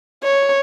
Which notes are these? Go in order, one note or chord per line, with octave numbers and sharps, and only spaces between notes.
C#5